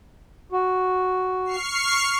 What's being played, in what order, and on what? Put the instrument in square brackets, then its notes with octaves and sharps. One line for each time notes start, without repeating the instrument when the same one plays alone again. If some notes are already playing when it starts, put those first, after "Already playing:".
[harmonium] F#4
[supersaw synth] C#6 F6 C7